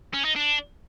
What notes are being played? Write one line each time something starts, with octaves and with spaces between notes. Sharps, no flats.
C#4
D#4
D4